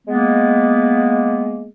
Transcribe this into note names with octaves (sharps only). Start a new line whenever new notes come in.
G#3 A#3 B3